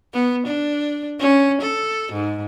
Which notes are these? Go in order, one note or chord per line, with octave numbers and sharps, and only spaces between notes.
B3
D4
C#4
A4
G#2